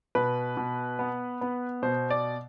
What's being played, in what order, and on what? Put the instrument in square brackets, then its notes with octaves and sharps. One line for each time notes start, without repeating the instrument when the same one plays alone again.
[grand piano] B2 B4
B2
B3
B3
B2 C5
D5